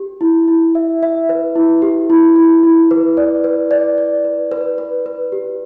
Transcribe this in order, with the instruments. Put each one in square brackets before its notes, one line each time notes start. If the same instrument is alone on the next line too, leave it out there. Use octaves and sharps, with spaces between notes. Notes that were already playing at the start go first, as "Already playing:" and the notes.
Already playing: [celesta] G4
E4
E4
E5
E5
B4
E4
G4
E4
E4
E4
B4
D5
B4
D5
D5
B4
B4
B4
B4
G4